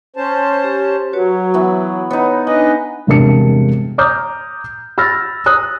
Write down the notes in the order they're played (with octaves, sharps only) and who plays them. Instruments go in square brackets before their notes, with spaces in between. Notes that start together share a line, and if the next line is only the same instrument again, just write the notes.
[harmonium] C#4 C5 A5
[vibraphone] G4
[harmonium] F#3 [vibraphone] F#4 B4 C#5
[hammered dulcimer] E3 B3 E4 [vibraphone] C#6
[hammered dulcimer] B3 D#4 [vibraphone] C#5
[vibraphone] D4 D#4 G#5 [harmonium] B4 D#5 [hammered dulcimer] F#5
[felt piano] E1 G2 C3 A#4 A5 C#7
A#5 D6 D#6 F6 G6
B5 E6 F6 A6 A#6
D#6 F#6